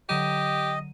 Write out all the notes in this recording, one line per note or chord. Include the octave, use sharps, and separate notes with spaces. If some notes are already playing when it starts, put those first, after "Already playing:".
D3 F#3 G4 D#5 D#7